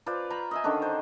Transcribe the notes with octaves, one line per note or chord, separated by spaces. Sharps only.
F4 B4 C5 D5
C5 A#5 B5 C#6
D#5 E5 G#5
D3 D#3 C#4 D4
C5